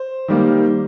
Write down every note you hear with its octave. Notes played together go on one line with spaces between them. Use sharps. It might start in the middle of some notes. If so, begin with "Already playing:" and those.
Already playing: C5
D#3 G3 A#3